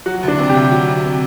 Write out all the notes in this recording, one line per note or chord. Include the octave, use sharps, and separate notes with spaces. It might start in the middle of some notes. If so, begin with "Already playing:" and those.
F#3 F#4
D2
D4
C3
G4
D2
F#3
D2
C3